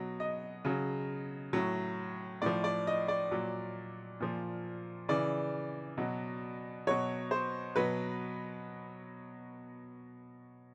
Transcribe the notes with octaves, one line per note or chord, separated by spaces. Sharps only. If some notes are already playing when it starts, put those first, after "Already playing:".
Already playing: B2 F#3
D#5
C#3 F#3
A2 F#3
A2 F3 D5
D5
D#5
D5
A#2 F#3
A#2 F3
C#3 E3 D5
B2 F#3
B2 F#3 C#5
C5
B2 F#3 B4